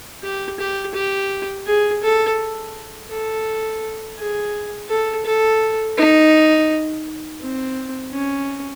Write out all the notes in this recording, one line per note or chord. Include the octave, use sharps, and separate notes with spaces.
G4
G4
G4
G#4
A4
A4
G#4
A4
A4
D#4
C4
C#4